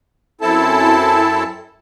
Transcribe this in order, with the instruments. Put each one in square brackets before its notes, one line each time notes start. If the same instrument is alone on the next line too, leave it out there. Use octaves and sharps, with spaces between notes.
[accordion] F#2 C4 E4 A4 A5